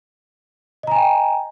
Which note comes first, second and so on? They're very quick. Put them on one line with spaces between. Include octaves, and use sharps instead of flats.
D#5 A#5 G#5 G5